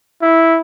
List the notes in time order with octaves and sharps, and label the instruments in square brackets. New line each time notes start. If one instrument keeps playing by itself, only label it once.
[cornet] E4